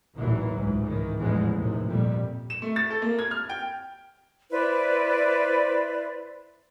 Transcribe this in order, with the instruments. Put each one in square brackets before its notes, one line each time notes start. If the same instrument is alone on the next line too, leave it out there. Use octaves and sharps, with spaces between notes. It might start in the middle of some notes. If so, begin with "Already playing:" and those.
[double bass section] A1 D#2 A#2 E3 F#3
C#2 G#2
D#3 E3
A1 E2 G#2 E3 F3 G#3
D#2 A2 C3
F2 A#2 G3
[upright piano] E7
A3
A6
A4
A#3
G#6
F6
G5
[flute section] E4 B4 C5 D5